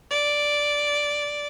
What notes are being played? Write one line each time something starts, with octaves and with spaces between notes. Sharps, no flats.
D5